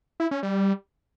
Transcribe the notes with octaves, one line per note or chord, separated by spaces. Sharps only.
E4
C#4
G3